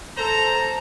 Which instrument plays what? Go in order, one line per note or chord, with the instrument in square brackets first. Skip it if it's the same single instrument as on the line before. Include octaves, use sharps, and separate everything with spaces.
[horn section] A4 C5 A#5